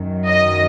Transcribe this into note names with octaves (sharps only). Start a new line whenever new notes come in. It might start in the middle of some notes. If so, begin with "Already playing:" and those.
Already playing: F#2 D#3 F#3
D#5